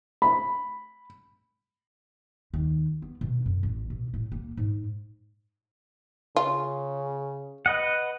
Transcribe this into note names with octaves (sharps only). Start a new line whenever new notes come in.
B5
D#2
B3
B2
F#2
A1
B2
A2
A#3
G#2
C#3 F4
B4 D#5 F#5